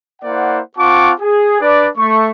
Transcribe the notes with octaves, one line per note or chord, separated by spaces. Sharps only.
A#3 E4 C5 D5 F#5
C4 F4 F#5 A5 C#6 D6
G#4
D4 B4 D5
A3 C#6